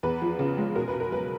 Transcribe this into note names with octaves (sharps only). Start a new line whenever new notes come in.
E2 B4
F3
C#3
G#3
B2 A#4
B4
B2
A#4
F#3 B4